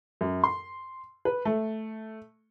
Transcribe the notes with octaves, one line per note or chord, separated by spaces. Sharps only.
F#2
C6
B4
A3